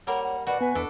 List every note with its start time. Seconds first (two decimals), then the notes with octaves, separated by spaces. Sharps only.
0.07 G3 A#3 A#4 C#5 F#5
0.23 F#5
0.47 B2 F#4 D5 F#5
0.61 B3 B4 G#5
0.75 E2 D4 A4